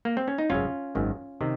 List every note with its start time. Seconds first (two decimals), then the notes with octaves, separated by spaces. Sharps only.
0.05 A#3
0.17 C4
0.28 C#4
0.38 D#4
0.50 G#1 F#2 C#3 C#4 F4
0.95 G#1 F#2 D#3
1.41 C3 D#3